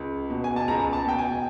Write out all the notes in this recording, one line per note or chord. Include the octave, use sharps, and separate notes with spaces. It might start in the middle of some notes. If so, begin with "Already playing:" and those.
Already playing: C#2
B2
G#5
A5
C#2 A#5
A5
B2 G5
G#5